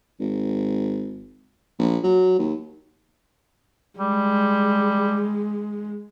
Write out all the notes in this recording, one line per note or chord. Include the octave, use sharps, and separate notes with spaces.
G#1
A#1
F#3
D#2
G3 G#3